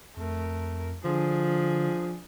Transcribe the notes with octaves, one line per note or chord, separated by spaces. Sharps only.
F2 A3 A#4
D3 F3 D4 G#4